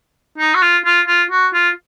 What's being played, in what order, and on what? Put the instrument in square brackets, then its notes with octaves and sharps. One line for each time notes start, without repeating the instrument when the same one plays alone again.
[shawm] D#4
F#4
F4
F4
F4
F#4
F4